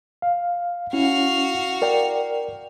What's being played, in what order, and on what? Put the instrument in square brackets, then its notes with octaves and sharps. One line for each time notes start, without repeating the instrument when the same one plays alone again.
[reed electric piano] F5
[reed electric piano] C#4 E4 [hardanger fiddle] F#4 F5
[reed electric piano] A#4 D5 G5